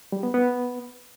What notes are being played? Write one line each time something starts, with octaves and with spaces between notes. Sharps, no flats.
G3
B3
B3